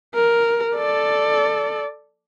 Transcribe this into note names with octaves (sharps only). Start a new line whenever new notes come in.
A#4
A4 D5